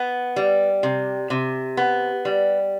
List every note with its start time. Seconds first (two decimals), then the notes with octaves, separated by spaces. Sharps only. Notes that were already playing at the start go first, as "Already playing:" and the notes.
Already playing: B3
0.36 G3
0.83 C3
1.30 C3
1.77 B3
2.25 G3